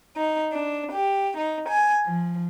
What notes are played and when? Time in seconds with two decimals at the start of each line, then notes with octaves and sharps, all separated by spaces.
0.17 D#4
0.53 D4
0.91 G4
1.36 D#4
1.68 G#5
2.07 F3